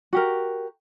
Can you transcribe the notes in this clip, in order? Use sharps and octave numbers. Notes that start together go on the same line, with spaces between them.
F#4 G4 A#4